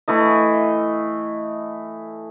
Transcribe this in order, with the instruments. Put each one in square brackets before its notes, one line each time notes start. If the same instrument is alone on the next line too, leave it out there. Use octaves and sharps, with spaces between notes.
[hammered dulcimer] E3 A3 D#5